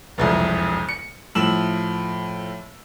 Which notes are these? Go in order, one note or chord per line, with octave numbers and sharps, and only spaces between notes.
E1 C2 F2
C#7
A2 F3 E6 E7 F#7